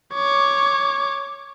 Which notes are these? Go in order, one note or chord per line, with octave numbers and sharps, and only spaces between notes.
C#5 D6